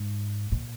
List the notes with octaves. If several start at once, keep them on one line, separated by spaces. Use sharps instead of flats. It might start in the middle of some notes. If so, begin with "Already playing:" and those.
Already playing: G#2
A#2